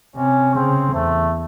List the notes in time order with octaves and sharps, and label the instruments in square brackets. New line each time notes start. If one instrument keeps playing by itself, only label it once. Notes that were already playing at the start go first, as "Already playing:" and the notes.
[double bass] C3 [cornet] C#4
[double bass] C#3 [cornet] C4
[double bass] E2 [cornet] A3